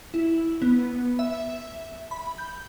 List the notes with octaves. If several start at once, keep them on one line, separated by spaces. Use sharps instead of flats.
E4
B3
E5
B5
G6